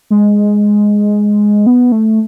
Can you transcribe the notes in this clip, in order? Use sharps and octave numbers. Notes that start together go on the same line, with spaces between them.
G#3
B3
A3